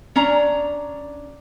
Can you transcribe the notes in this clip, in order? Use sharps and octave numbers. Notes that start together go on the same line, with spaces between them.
C#4 D4 A#5